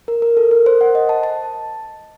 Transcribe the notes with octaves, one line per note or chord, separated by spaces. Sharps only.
A#4
A#4
A4
A#4
C5
F#5
D#5
A5
A5